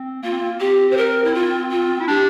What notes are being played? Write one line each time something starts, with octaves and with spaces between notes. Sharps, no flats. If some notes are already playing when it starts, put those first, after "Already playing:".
Already playing: C4
A#3 F4
C4
A#3
C4 G4
C5
A#4
E4
F4
F4
E4
D4 G4